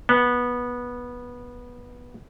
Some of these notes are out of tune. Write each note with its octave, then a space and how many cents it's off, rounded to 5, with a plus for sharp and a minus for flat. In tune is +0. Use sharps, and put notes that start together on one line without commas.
B3 -15